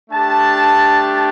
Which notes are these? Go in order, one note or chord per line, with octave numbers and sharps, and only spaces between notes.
A3 D4 G4 A5